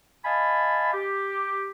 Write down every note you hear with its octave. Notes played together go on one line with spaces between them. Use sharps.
D#5 F5 G#5 A5 B5
G4